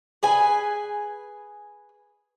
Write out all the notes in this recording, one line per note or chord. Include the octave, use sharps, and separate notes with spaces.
G#4 B4 G#5